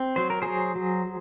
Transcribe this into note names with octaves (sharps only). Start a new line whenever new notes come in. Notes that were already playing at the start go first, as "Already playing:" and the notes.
Already playing: C4
F#3 C5
A#4
F#3 G#4 C5
F#3